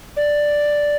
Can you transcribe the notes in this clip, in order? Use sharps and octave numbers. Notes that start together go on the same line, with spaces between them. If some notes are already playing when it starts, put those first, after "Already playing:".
D5